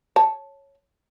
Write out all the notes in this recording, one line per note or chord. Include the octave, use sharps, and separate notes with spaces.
C#5 A5